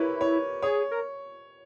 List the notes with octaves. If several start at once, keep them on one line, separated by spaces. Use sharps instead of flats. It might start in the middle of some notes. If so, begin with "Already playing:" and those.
Already playing: E4 G4 A#4 B4 C#5
C#5
G#4 C#5
A#4